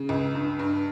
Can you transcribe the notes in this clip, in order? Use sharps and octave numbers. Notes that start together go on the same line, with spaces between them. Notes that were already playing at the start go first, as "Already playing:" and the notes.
Already playing: C#3
C#2
G2
G2